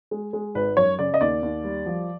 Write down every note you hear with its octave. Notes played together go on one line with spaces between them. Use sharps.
G#3
G#3
G#1 B4
F#2 C#5
C#3 D5
D#5
D#2 D5
D#2
G3
F3